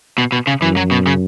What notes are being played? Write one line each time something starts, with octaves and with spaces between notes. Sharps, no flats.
B2
B2
C#3
F#2 E3
F#3
B2
C#3